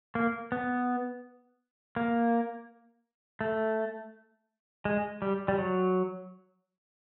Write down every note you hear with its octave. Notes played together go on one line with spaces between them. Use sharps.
A#3
B3
A#3
A3
G#3
G3
G3
F#3